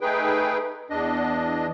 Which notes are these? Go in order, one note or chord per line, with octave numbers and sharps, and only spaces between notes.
A3 D#4 G#4 B4 G5
E2 D4 D#5